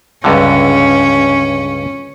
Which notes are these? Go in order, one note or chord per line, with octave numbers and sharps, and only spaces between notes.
C#2 G2 D3 C#4